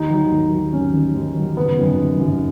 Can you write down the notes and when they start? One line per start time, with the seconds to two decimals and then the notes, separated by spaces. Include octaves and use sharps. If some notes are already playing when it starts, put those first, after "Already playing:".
Already playing: D#2 D#4
0.10 D#3 F#3
0.32 D#2
0.52 D#3 F#3
0.73 D#2 C#4
0.94 D#3 F#3
1.15 D#2
1.35 D#3 F#3
1.57 F#1 B3
1.78 F#2 D#3 F#3
1.98 F#1
2.19 F#2 D#3 F#3